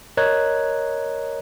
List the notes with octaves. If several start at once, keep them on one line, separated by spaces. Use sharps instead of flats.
A#4 C#5 D#5 A#5 F#6 G#6